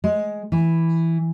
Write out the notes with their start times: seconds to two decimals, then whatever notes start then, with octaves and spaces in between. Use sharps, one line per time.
0.04 G#3
0.52 E3